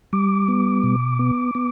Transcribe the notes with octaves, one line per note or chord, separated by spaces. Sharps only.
G3 D6
B3
B2
B3
B3